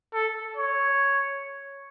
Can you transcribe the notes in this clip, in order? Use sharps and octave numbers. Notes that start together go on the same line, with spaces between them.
A4
C#5